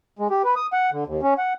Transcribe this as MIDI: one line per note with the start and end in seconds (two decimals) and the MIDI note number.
0.19 0.28 56
0.31 0.42 67
0.44 0.55 71
0.56 0.67 87
0.73 0.90 78
0.92 1.04 50
1.07 1.21 39
1.22 1.34 61
1.38 1.53 78